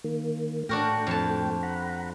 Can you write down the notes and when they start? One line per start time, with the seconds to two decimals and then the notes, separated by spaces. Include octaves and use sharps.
0.04 D#3 A#3
0.69 A2 A3 D4 F#4 A#4 G5
1.07 F2 A5
1.63 F#5 A#5 B5